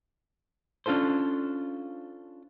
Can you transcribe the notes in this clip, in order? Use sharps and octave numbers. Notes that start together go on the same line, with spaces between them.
C#4 D4 F4 A4 C5